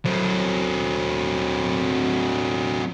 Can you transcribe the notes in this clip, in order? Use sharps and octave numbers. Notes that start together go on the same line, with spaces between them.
F#3 C4